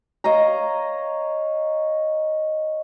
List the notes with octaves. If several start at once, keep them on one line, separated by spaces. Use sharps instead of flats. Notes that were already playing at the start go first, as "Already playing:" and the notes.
C#5 D#5 F5 A#5